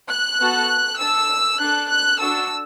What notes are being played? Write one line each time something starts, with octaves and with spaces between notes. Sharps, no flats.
F#6
B3 F#4 A4
D4 A4 E6
D4 A4 F#6
F#6
D4 F#4 A4 E6